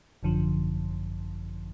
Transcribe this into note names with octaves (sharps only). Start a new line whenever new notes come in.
G#1 F#2 D3 F3